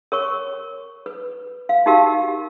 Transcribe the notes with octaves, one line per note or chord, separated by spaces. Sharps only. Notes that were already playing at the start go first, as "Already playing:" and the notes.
A#4 C#5 C#6
B4
F5
D#4 F#4 G4 A#4 F5